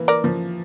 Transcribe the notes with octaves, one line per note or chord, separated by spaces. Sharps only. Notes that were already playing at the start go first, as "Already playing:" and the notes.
Already playing: E3 A#3
A#4 D5
F3